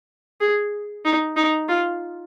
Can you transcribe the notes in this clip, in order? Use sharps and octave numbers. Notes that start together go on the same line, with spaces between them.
G#4
D#4
D#4
F4